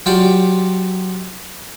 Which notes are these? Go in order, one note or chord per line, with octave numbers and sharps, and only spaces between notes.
F#3 F4 G4 D5